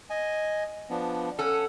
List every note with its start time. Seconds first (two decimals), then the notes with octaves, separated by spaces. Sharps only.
0.10 D#5 G#5
0.90 F3 B3 D4
1.39 C#4 A4 F#5